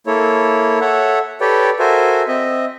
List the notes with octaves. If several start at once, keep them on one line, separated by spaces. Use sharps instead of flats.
A#3 E4 A4 C#5
A4 C#5 E5 F#5
G4 A4 B4 C#5 D5 G5
F#4 A4 A#4 C5 E5 G#5
C4 D#5 E5